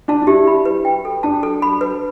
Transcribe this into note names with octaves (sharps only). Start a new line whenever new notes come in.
D4 A5
D4
E4 G4
B5
B4
G5
A4
D4 A5
A4
B5
B4